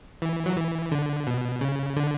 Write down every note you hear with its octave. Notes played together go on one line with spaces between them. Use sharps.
E3
F#3
E3
D3
B2
C#3
D3